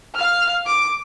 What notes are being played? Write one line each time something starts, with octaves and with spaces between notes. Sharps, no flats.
F5 F6
D6